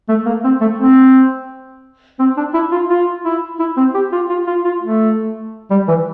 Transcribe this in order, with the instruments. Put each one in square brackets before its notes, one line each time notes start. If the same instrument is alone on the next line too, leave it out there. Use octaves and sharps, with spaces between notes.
[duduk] A3
A#3
C4
A3
C4
C4
D4
E4
F4
F4
E4
E4
C4
G4
F4
F4
F4
F4
A3
G3
E3